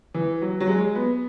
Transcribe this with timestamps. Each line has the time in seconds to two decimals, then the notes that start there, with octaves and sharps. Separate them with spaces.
0.14 E3
0.42 F#3
0.60 F#3
0.68 G#3
0.95 B3